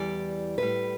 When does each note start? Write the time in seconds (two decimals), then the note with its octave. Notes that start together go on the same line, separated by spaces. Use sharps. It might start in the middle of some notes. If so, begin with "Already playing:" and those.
Already playing: E2 E3 G3 D5
0.58 A2 G3 B4